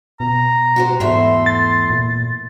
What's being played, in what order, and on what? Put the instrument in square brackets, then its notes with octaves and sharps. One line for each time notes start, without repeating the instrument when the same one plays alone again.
[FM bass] B2 [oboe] A#5
[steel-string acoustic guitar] F#4 G4 C5
[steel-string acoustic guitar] E2 A3 E5 [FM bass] G#2 [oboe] C6
[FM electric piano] A6
[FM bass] A#2